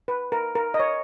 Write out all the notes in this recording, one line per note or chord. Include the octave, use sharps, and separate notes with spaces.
B4
A#4
A#4
D#5
C#5